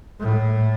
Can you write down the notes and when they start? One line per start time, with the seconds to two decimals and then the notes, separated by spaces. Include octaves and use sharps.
0.20 A2